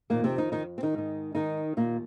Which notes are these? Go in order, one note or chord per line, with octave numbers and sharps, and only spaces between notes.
F2 A#2 D#3 A#3
C3 C4
D#3 D#4
D#3 D#4
C4
D#3 D#4
G#2 D#3
D#3 D#4
D#2 A#2 D#3 A#3